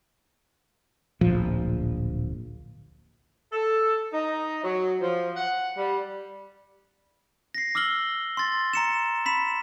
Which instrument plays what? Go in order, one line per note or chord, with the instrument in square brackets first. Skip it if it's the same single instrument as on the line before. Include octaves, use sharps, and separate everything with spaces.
[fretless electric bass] D1 A#1 F3
[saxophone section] A4
D#4
F#3
F3
F#5
G3
[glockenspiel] A#6 C7
D6 E6 F6 F#7 G7
C6 A6
A#5 C#7 E7
B5 B6 E7